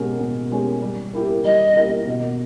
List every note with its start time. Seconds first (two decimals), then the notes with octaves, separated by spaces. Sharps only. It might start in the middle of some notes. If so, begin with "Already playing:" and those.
Already playing: B2 G#3 C#4 G4 A#4
0.19 B2
0.51 G#3 C#4 G4 A#4
0.82 G3
1.13 A#3 E4 G4 A#4
1.44 G3 D#5
1.76 A#3 E4 G4 A#4
2.07 B2